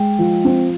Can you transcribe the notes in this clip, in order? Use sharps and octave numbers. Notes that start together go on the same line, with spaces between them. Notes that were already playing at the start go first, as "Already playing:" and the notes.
Already playing: G#3 G5
F3
C4